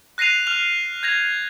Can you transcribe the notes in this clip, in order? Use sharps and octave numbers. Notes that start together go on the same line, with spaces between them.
F#6 A#6 C7 D#7 F7
F6 F7
G6 G#6 A#6 F7